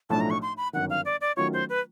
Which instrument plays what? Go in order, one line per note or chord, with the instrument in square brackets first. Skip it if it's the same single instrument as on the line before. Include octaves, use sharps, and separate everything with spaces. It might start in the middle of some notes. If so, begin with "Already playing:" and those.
[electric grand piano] B1 A2 F3 A3 D4 [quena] A5
[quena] A#5
C#6
C6
B5
[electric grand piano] G1 F#2 D#3 [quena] F#5
[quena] F5
D5
D5
[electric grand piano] D#3 F#3 A3 C#4 F4 [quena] C#5
[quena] C5
B4